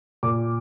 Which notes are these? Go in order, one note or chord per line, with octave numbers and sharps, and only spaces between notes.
A#2 D6